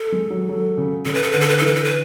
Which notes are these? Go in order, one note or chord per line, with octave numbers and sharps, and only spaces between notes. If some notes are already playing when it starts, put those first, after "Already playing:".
Already playing: A4
G#3
F#3
F#3
C#3
C#3 A4
B4
A4
D3 B4
A4
B4
E3 A4
B4
A4
B4